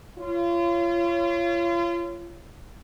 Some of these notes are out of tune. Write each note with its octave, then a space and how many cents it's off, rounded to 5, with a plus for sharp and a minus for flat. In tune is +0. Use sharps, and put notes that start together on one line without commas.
F4 -35 C#5 +0